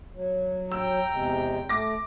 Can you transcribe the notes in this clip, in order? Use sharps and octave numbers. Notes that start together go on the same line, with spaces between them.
F#3
G5 A#5 E6
E2 C3 G#3
A3 D6 A#6